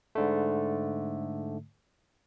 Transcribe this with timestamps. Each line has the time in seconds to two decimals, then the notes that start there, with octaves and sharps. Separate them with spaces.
0.15 G#2 D3 A3